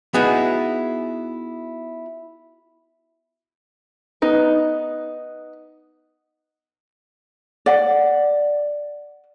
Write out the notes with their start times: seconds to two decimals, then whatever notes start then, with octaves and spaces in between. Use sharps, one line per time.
0.14 B3 D#4 E4 F#4 G#4
4.22 B3 D#4 B4
7.66 D5 F#5